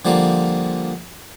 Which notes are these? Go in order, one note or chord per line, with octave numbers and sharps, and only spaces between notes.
D3 F3 G3 A#3